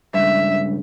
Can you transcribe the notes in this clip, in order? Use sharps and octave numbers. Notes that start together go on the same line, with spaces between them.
C#2 G2 E5